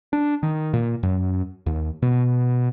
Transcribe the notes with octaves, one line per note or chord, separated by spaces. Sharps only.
D4
D#3
A#2
F#2
D#2
B2